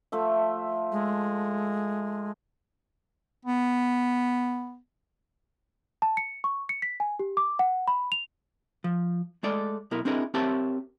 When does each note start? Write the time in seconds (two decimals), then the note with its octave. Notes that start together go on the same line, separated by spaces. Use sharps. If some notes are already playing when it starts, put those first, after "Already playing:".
0.12 F3 A3 E5
0.92 G#3
3.45 B3
6.02 A5
6.17 C#7
6.44 C#6
6.69 C#7
6.82 B6
7.00 G#5
7.19 G4
7.37 D6
7.59 F#5
7.88 B5
8.12 F7
8.84 F3
9.43 G#3 A3 A4 D5 D#5
9.91 B1 B3 E4 A#4
10.05 C4 D4 E4 G#4 A#4 D#5
10.34 C4 G4 A#4 C#5 E5 A5